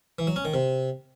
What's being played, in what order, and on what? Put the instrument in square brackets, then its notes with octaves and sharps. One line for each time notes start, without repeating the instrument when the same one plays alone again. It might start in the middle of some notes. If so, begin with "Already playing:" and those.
[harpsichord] E3
F#3
C#4
D#3
C3